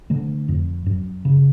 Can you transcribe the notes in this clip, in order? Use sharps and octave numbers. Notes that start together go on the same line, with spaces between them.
D3 A3
F2
F#2
C#3